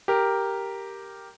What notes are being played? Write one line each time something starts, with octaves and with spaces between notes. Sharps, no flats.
G4 A#4